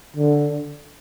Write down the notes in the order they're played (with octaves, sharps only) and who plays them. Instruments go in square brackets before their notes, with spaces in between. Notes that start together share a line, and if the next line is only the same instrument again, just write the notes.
[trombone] D3